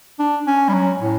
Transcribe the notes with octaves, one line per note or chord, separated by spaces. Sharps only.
D4
C#4
G3
F#3
A2